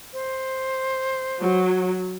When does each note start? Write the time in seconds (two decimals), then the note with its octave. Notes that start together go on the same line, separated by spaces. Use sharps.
0.13 C5
1.39 F#3